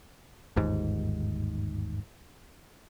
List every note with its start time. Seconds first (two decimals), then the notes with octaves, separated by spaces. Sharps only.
0.56 G1 D#2 G#2